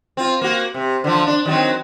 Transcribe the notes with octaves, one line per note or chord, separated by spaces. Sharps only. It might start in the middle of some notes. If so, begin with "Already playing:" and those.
C4 F4
A#3 F#4
C3
D3 F3
D4
D#3 F#3 C4